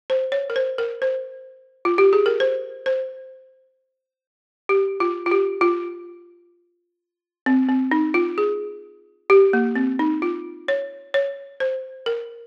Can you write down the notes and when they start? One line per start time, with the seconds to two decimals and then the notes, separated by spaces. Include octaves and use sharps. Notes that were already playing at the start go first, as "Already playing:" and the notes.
0.10 C5
0.32 C#5
0.50 A#4
0.56 C5
0.78 A#4
1.02 C5
1.85 F4
1.98 G4
2.13 G#4
2.26 A#4
2.40 C5
2.86 C5
4.69 G4
5.00 F4
5.26 F4
5.31 G4
5.61 F4
7.46 C4
7.69 C4
7.92 D#4
8.14 F4
8.38 G#4
9.30 G4
9.53 A#3
9.76 C4
9.99 D#4
10.22 F4
10.68 C#5
11.14 C#5
11.60 C5
12.06 A#4